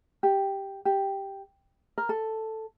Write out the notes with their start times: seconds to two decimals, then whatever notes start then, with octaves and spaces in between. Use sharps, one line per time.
0.23 G4
0.85 G4
1.98 A#4
2.09 A4